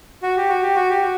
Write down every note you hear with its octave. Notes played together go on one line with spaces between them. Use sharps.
F#4
G4
F#4
G4
F#4
G4
F#4